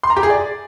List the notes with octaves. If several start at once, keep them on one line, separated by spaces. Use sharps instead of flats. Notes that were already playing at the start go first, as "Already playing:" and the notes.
C6
A#5
G4
G#4
D5